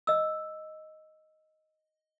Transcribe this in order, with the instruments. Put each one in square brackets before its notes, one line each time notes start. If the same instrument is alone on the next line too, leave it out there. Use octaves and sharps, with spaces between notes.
[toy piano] D#5 E6